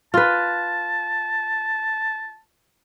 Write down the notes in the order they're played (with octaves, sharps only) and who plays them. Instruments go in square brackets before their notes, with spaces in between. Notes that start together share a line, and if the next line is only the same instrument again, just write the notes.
[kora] F4 B4 [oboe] A5